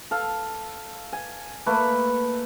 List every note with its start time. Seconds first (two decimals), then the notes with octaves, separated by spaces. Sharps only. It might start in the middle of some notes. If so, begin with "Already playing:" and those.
0.11 A4 F5
1.13 G#5
1.66 A3 A#3 B4